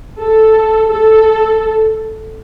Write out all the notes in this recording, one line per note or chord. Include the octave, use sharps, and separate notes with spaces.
A4
A4